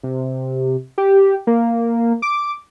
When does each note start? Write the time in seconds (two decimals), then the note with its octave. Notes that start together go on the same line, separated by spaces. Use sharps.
0.03 C3
0.98 G4
1.47 A#3
2.22 D6